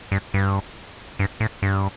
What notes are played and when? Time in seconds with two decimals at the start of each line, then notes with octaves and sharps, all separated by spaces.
0.12 G2
0.34 G2
1.19 G2
1.40 A2
1.62 G2